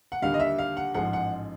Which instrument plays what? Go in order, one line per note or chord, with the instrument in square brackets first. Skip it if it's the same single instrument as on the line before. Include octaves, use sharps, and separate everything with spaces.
[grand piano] F#5
D#2 D3 G3 F5
D#5
E5
F5
F#5
A1 G#2 F3 G#3 F#5
F#5